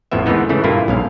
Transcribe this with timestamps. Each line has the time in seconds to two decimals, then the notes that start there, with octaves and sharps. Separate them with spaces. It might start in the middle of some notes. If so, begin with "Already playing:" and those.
0.12 A1 F2 A2 F3 B3 E5
0.26 G#2 D#3 E3 A3 B3 D#4
0.49 C#3 E3 A3
0.64 G2 A#2 A#3 E4 F4
0.88 B1 G#2 F5